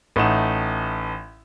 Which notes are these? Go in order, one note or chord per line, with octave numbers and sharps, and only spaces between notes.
A1 A3 D#4 F#5 E7